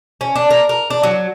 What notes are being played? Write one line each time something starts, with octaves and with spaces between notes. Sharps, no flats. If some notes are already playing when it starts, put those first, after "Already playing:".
C#4
D4
A#4
A#4
D4
F#3